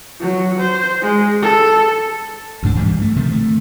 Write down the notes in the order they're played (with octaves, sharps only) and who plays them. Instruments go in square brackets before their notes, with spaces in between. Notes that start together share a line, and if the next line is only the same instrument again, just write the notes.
[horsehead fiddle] F#3
C5
G#3
A4
[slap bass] D2 G#2 D4
G2 E3 F3 G3
A3
C3 D#3 F3
A3